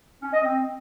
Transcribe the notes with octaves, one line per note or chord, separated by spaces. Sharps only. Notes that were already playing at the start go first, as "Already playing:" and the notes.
C#4
D#5
C4